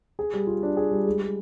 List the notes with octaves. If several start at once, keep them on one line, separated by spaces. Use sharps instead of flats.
G#4
G3
F4
D4
G#4
G3
G#3
G#3